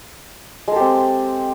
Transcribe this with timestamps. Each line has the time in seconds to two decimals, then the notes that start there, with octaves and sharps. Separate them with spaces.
0.68 G#3
0.72 A4
0.76 G4
0.80 C4